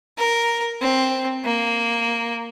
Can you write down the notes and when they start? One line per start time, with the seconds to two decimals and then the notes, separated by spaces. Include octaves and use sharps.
0.18 A#4
0.81 C4
1.45 A#3